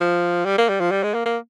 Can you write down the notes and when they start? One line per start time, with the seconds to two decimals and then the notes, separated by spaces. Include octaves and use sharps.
0.01 F3
0.45 G3
0.58 A#3
0.69 G3
0.80 F3
0.91 G3
1.03 G#3
1.14 A#3
1.26 A#3